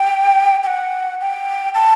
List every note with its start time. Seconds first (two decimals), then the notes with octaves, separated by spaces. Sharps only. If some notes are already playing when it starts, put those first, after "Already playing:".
Already playing: G5
0.63 G5
0.67 F#5
1.21 G5
1.74 A5